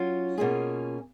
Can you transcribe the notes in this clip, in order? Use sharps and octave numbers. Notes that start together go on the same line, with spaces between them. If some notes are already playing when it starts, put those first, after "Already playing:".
Already playing: F#3 C#4 F4
B2 A#3 C#4 F4 G#4